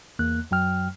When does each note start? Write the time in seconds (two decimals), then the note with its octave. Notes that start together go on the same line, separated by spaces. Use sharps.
0.19 E2 A#3 F#6
0.51 F#2 F#3 G5 F6